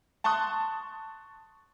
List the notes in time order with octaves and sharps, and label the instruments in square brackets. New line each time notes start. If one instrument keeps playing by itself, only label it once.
[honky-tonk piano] A5 C6 C#6 D#6 F#6